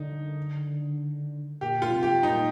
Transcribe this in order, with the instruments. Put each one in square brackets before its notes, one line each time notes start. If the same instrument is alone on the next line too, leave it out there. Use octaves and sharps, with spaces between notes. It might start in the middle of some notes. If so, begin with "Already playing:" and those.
Already playing: [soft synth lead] D3 [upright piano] D#4
[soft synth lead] A#2 [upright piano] G4
[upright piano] F4
[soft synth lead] C3
[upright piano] G4
[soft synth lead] A#2 [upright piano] D#4